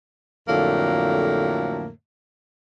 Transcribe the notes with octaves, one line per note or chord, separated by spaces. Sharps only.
F2 A2 D3 F#3 A3 A#3